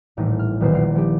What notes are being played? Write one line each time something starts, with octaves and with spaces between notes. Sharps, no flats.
D#1 A1 A2 D#4 A#6
F6
D#1 B1 E2 D#3 E4 C5
A#1 A#4 C7
F3 D#4 G4